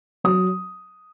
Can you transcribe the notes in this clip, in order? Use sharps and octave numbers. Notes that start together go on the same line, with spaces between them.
F#3 D#6